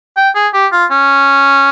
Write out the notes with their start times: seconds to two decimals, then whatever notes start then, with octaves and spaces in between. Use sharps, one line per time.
0.17 G5
0.35 G#4
0.54 G4
0.72 F4
0.91 C#4